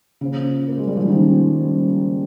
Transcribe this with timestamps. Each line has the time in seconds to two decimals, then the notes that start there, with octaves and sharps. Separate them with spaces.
0.21 C#3 A#3 F4 C5 F5
0.68 A#3
0.78 G#3
0.87 G3
0.97 F3
1.07 D#3 G3 A#3 C#4 G4 C5